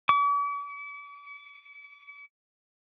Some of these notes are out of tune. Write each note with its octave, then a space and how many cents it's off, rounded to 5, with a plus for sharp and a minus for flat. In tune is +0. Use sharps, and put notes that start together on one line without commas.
D6 -45